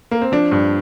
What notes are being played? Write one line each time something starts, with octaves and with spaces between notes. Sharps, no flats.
A#3
C4
F3 D4
G2